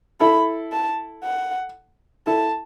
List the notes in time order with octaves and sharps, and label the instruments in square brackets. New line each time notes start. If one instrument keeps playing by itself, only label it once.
[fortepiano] E4 A4 [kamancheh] B5
[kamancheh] A5
F#5
[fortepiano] E4 A4 [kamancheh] A5